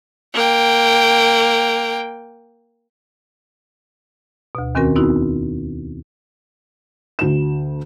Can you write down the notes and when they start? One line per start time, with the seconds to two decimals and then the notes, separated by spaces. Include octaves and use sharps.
0.34 A#3 G5
4.55 D2 B2
4.75 E2 D#3 C4 C#4 F#4 A#4
4.96 B3 C4 D#4 E4 F#4
7.19 D2 E7